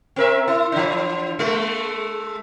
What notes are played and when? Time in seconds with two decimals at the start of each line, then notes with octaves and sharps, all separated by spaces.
0.16 C4 A#4 E5
0.48 E4
0.72 E3 D4
1.39 G#3 A3